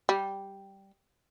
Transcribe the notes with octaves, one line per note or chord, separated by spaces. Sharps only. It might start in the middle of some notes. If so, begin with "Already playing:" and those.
G3